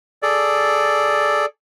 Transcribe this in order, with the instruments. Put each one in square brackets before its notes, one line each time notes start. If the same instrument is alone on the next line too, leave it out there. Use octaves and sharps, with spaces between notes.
[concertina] G#4 A4 D5